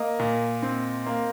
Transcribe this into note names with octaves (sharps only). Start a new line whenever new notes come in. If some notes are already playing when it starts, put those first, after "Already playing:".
Already playing: A#3 D#5
A#2
C4
A#3